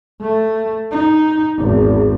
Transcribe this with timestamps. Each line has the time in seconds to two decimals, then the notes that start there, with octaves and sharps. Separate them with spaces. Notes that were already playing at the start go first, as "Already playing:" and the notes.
0.21 A3
0.92 D#4
1.56 G#1 E2